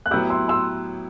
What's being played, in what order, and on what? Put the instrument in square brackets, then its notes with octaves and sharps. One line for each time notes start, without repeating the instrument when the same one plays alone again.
[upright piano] F#6
[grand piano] A2 F#3 B3 E4 G4 [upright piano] E6 G6
[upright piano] C6 E6
C6 E6